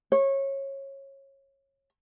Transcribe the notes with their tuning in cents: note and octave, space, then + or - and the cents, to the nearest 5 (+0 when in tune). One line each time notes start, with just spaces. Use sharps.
C#5 -20